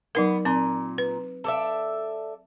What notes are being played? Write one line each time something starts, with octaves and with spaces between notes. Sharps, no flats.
F#3 B3 D#4 A#4
A#2 C4
B4
A4 D5 E5